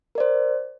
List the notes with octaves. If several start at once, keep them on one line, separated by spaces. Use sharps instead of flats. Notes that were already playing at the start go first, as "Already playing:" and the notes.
A#4 C5 D5